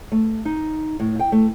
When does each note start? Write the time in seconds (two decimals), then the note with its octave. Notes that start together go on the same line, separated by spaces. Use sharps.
0.12 A3
0.45 D#4
1.00 A2
1.19 G5
1.32 A3